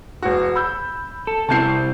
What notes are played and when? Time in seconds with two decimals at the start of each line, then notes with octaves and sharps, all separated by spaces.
0.22 E1 F#4
0.55 B5 E6 G6
1.27 A4
1.49 C3 C4 E4 A5 G6 C7